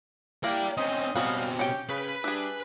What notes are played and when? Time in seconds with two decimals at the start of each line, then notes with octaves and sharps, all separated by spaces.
0.44 A#3 D4 E4 D5 G5
0.77 C4 C#4 C5 D#5
1.15 B2 F#3 G3 C4 C#4 D#5 F5
1.59 C#4 G4 C#5 G5
1.89 C#3 B4 B5
2.24 G3 D4 G#4 E5